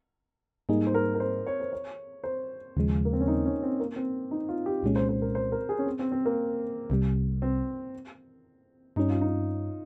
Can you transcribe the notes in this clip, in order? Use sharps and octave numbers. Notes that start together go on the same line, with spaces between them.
G#2 G3 A#3 D#4 G#4
C5
A#4
A#4
C5
C#5
C5
C#5
C5
D#2 C#3 F3 G#3
A#3
C4
C#4
D#4
C#4
C4
A#3
C4
D#4
F4
G4
C2 A#2 G#3 C#4
C5
C5
A#4
C5
A#4
G#4
C#4
C4
C4
C4
A#3
C2 C3 G3
C4
G2 G3 C#4 D#4
F4
D#4